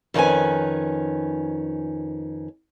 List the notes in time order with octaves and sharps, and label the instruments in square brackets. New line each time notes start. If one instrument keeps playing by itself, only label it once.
[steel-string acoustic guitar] F2 D#3 C#4 B4 G#5